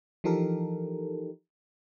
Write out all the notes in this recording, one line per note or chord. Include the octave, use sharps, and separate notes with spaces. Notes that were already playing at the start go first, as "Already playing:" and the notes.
E3 F3 D#4 G4 A4 A#4